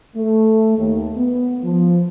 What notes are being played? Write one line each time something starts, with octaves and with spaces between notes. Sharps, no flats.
A3
D#2
B3
F3